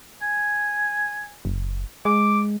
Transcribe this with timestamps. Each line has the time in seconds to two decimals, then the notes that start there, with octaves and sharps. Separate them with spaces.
0.22 G#5
1.45 F#1
2.05 G#3 D6